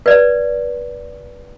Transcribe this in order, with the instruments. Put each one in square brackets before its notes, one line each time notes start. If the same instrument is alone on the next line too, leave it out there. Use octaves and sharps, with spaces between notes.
[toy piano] B4 D5